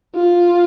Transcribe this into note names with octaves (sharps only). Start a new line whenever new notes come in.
F4